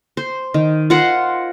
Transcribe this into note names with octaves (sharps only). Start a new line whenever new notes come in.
C5
D#3
F4 A#4 C5 F#5